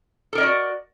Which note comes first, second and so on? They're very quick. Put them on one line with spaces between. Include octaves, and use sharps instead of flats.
A4 A#4 D#5 D5 F#4